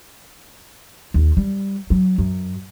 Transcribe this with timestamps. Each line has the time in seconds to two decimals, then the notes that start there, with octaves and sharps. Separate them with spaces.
1.14 D#2
1.37 G3
1.90 F#3
2.18 F#2